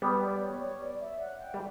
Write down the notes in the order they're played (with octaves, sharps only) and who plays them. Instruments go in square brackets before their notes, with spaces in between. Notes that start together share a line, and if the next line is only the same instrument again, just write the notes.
[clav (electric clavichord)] G3 B3 [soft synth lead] B4
[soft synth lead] D5
C#5
C#5
D5
E5
F#5
G5
[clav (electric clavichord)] G3